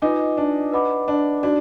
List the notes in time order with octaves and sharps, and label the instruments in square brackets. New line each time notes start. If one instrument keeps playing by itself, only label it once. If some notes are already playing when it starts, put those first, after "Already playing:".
[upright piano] D#4 [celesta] F4 B4 D#5 G#5 D6
[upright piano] D4
[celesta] B4 D#5 F#5 B5 D6
[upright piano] D4
[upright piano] D4 [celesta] D#4 F#4 D5